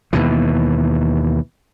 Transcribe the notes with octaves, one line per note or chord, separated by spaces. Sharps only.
D#2 B2 E3